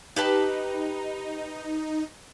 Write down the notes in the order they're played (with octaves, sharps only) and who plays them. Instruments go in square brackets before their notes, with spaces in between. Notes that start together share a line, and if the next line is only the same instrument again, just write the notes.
[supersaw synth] D#4 [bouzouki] G4 B4 A5